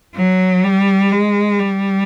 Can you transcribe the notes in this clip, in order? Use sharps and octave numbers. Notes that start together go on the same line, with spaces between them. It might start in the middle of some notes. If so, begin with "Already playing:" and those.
F#3
G3
G#3
G3